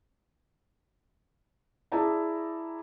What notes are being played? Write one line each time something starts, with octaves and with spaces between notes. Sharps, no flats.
E4 G#4 D5 A5 A#5